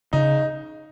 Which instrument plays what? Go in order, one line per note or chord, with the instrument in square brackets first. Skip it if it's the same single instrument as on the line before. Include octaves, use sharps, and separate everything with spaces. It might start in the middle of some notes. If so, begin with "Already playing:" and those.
[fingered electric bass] C#3 [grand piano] D#4